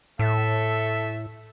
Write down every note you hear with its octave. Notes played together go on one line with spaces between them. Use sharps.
A2 A3 A4 E5